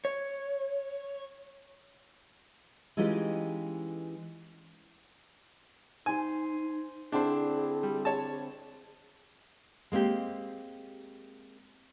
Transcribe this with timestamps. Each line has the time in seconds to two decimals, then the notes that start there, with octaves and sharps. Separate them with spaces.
0.05 C#5
2.97 E3 G#3 C#4 D#4 F4 G4
6.06 D#4 C5 G#5 C6
7.12 D3 C4 D4 E4 G#4 C5
7.83 G3
8.05 C#5 A5
9.92 G#3 A#3 C4 G4